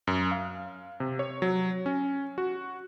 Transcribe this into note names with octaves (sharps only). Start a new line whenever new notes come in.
F#2
F5
C3
C#5
F#3
C#4
F#4